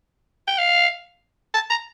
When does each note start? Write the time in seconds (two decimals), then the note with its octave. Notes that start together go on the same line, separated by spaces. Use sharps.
0.48 G5
0.58 F5
1.54 A5
1.70 A#5